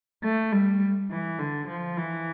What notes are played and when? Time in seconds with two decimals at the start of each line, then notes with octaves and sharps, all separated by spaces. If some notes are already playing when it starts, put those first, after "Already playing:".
0.23 A3
0.52 G3
1.10 E3
1.39 D3
1.68 F3
1.97 E3